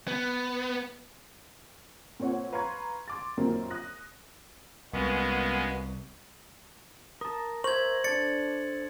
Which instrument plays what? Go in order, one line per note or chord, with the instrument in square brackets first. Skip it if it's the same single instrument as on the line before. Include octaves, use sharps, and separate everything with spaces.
[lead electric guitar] B3
[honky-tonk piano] A#2 C4 C#5 F#5
B4 F5 A#5 C6 C#6 G#6
C6 D6 A6
F#2 A#2 D#3 A#3 C4 C#4
D#6 F#6 A#6
[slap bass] C2 [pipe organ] G#3 B3 C#4 [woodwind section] A#3 F#4 B4
[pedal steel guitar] A#4 A5 [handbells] D#6
[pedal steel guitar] A#4 E5 [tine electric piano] C5 [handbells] C#6 [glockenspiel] G#6 F#7
[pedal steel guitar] D4 A4 D5 [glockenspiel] A6 C#7